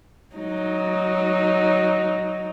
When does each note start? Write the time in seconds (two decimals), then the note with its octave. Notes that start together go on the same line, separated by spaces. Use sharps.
0.35 F#3 D#4